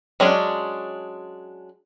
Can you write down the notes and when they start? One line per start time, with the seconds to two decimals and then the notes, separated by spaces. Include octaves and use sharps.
0.20 F#3 G#3 C#4 D4